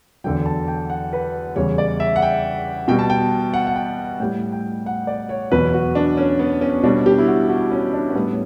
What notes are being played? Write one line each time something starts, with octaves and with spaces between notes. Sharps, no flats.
E2 D3 F#3 G5
A5
G5
F#5
B4
E2 C#3 G3 C#5
D5
E5
F#5
G5
B2 G3 G5
A5
G5
F#5
F#5
G5
A2 G3 G5
G5
F#5
D5
C#5
E2 B2 F#3 B4
F#4
D4
C#4
B3
C#4
B2 G3 D4
G4
E4
F#4
F#4
C#4
D4
C#4
A2 G3 B3